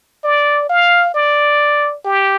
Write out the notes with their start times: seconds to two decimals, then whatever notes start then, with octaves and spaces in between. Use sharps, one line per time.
0.24 D5
0.69 F5
1.14 D5
2.05 G4